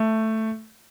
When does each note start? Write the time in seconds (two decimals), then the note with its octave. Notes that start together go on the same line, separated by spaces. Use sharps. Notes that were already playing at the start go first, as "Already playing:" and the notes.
Already playing: A3